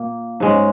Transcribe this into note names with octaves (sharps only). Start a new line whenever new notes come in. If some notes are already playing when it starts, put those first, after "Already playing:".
Already playing: A#2 A#3
G#2 G#3 C#4